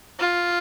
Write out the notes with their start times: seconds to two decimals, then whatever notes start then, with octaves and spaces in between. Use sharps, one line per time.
0.19 F4